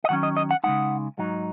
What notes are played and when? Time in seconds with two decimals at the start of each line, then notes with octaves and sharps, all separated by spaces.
0.04 D#5
0.09 D#3 F#3 C#4 F#5
0.23 D#5
0.37 D#5
0.51 F#5
0.64 C#3 G#3 D#4 F#5
1.18 G#2 F#3 D#4